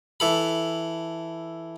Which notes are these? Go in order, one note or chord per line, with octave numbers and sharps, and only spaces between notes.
E3 A4 B5